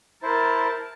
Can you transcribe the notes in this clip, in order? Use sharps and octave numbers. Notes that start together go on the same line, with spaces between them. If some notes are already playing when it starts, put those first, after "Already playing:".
E4 A#4 C5 A5